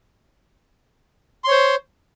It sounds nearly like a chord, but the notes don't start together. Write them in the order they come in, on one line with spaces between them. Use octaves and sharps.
C6 C#5 C5